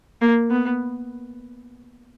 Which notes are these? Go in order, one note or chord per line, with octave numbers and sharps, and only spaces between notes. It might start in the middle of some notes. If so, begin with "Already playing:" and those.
A#3
B3